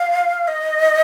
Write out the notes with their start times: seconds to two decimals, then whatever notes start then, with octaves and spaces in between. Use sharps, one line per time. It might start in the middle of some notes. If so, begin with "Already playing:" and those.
Already playing: F5
0.48 D#5